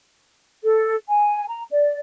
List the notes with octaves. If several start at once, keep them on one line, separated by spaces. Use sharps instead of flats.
A4
G#5
A#5
D5